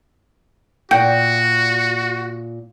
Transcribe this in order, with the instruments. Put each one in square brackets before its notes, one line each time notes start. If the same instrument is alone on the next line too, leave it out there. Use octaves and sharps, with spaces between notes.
[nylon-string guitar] A#2 F#5 [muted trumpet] F#4 [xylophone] G5 G6